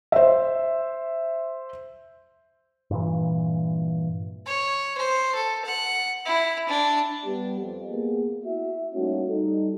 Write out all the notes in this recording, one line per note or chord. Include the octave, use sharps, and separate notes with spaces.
C5 E5
G2 A#2 E3
C#5
C5
A4
F#5
E4
D4
G3 B3 G4
F2
A#3 B3 G#4
E4 F#4 E5
G3 A3 A#3 C#4 D#4 F#4
G3 D#4 A4